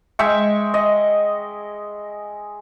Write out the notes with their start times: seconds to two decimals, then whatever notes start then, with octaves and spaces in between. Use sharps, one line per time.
0.19 G#3 E5 G5 C#6
0.74 D#5